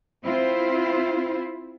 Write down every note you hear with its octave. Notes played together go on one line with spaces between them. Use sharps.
C4 E4 F4 C5